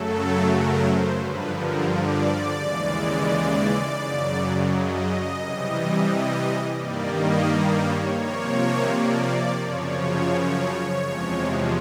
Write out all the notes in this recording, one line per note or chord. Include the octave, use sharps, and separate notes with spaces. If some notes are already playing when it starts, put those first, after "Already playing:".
Already playing: F#2 C#3 F#3 A3 A4
A#4
C5
G2 D3 F3 B4
A#4
D5
D#2 C#3 E3 G#3
F#2 C#3 F#3
D#5
C3 E3 G3
G2 D#3 G3 A#3 D5
D#5
C#5
C3 F3 A#3 C#5
D5
F#2 C#3 F3 C#5
E2 C3 F3 G#3